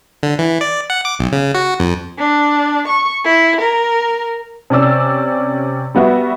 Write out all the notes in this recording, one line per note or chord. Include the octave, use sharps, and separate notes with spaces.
D3
E3
D5
F#5
D6
B1
C#3
F#4
F2
D4
C#6
E4
A#4
C3 C#4 D5 E6
G3 B3 F#4 E5